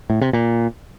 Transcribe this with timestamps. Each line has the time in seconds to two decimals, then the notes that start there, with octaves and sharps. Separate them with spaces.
0.10 A2
0.21 C3
0.33 A#2